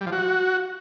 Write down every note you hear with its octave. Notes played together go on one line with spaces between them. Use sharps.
G3
F3
F#4